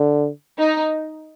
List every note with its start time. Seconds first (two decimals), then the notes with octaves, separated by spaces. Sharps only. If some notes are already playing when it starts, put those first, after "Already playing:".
Already playing: D3
0.58 D#4